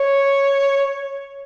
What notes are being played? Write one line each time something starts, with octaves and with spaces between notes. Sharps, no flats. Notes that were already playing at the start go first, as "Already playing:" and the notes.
Already playing: C#5